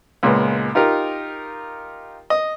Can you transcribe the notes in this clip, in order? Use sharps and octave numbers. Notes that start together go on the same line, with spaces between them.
C#2 A#2 G#3 B3
D#4 F4 G4 A#4
D#5